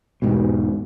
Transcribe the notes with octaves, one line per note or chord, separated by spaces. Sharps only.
E1 G#2 B2